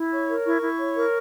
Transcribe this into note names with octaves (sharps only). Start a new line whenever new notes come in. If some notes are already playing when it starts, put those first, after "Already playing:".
Already playing: E4
C#5 C#6
A#4
E4 C#6
E4
C#5
A#4